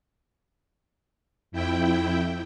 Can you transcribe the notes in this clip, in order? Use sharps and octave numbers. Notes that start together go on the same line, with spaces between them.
F2 E4 G5